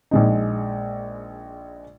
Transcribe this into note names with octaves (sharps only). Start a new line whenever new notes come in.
A#1 G#3 D#4